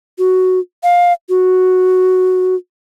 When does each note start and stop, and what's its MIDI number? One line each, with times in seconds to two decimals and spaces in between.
0.18 0.59 66
0.83 1.13 77
1.29 2.55 66